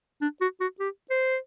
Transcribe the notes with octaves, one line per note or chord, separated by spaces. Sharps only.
D4
F#4
F#4
G4
C5